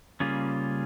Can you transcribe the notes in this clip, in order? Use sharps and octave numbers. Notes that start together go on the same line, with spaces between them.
C#3 G3 A#3 C#4 F4 G#4